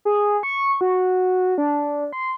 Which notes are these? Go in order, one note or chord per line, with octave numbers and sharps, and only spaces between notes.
G#4
C#6
F#4
D4
C6